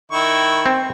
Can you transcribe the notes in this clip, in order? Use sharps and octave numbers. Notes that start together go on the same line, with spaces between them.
D#3 E4 C#6
C4